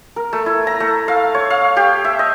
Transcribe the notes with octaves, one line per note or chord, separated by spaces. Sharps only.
A#4
A3
E4
A#5
A3
F5
C#5
F5
G4
E5
D#5